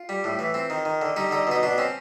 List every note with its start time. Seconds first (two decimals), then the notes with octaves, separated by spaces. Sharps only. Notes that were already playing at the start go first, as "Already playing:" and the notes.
Already playing: F4
0.09 G3
0.24 A2
0.39 E3
0.54 C4
0.70 D#3
0.85 D#3
1.02 D3
1.16 G3 D#4
1.31 D3 D#4
1.47 B2 D#4
1.63 B2 D4
1.78 C4 C#4